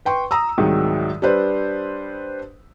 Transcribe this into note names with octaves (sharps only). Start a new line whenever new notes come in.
B4 G5 C6 C#6
A#5 D#6 E6
C2 G#2 D#3 F#3
G3 D4 B4 C5